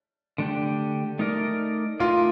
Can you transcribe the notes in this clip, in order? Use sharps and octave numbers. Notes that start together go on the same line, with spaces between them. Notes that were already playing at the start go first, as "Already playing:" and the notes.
D3 A3 D4 G4
A3 D#4 A#4 D5
A3 D#4 F4 A#4 D5